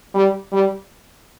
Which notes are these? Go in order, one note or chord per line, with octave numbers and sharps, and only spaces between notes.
G3
G3